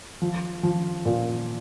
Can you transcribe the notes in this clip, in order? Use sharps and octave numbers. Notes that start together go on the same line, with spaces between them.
F3
F3
A#2